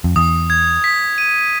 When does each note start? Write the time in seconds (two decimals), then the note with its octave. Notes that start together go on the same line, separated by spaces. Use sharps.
0.04 F2
0.16 E2 D#6
0.50 G#6
0.84 B6
1.18 D#7